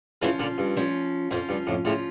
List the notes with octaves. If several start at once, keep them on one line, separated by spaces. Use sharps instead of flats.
C#3 E3 F3 C#4 F4
A#2 D3
G2
F3 C#4 F4
F2 F3 C#4 F4
G2
F2 A2
A2 C#3 F3 C#4 F4